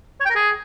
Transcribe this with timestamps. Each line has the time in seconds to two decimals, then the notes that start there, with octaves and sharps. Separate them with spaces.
0.20 C#5
0.25 G5
0.30 A#4
0.35 G#4